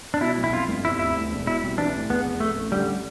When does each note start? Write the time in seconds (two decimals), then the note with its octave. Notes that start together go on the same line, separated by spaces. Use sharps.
0.14 D4
0.21 B2 E4
0.38 B1
0.44 E4
0.53 F2 F4
0.68 G1
0.85 C3 E4
0.99 D2 E4
1.16 D2
1.31 E1
1.47 B2 E4
1.63 C2
1.78 E3 D4
1.94 A2
2.10 E2 B3
2.25 F1
2.40 A2 A3
2.57 A1
2.72 D3 G3